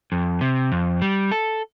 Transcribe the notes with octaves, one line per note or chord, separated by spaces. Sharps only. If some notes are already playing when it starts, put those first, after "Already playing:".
F2
C3
F2
G3
A4